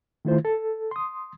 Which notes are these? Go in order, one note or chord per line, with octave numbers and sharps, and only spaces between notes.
D#3 A3 E4 F4 C5
A4
C6 D#6